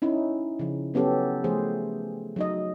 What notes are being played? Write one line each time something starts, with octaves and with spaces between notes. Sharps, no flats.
C#4 D#4 E4
C#3 F3
F#3 B3 C#4 G4 A4
F3 A3 G#4 C5
F#3 D#4 D#5